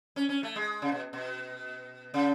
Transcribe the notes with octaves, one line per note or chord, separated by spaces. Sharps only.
C#4
C#4
A3
G#3
C#3
B2
B2
C#3